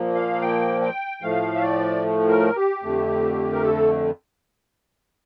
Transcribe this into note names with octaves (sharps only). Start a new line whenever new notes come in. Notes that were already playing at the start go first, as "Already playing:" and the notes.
Already playing: A#2 F3 A#3
F5
G5
G5
A2 F3 A3 F5
E5
D5
A#4
G4
F2 D3 A3
A#4
A4